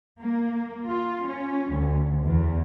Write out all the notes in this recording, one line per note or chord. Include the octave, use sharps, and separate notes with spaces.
A#3
F4
C#4
D2
E2